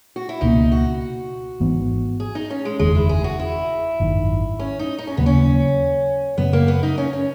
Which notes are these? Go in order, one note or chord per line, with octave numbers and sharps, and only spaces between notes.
F#4
E4
C#2 B2 A#3 C#4 D#4
F#4
G#1 G#2 E3 B3
G#4
D#4
C#4
G#3
F#1 E2 D#3 G#3
E4
G#4
F#4
E4
G#1 F#2 D#3
C#4
D#4
D#4
C#4
D#2 C#3 F#3 A#3 B3
C#4
F#2 C#3 F#3 B3 C#4
A#3
B3
D#4
C#4
C#4